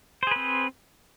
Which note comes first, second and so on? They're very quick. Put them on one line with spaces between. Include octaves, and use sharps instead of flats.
C5 G#4 B4 C4